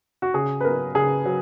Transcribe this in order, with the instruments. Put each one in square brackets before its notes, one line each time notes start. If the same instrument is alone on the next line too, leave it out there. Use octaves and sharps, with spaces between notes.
[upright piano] F#4
C#3 G#4
B4
F#3 B3 A#4
C#3 G#4
F#3